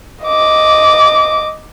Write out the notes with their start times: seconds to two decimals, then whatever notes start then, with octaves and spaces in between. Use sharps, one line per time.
0.24 D#5 D6